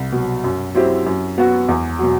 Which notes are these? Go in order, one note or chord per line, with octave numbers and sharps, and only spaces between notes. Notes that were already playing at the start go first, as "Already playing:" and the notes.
Already playing: C2
B2 F#3
F#2
F#3 C4 E4 G4
F#2
F#3 B3 F#4
E2
B2 F#3